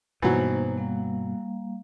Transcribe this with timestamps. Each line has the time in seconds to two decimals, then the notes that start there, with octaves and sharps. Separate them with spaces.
0.22 G2 B2 E3 F#3 A#3 D#4 C5
0.77 G3 A#3 F5